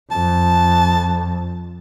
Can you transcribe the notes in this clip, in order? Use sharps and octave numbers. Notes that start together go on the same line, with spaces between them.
F2 A5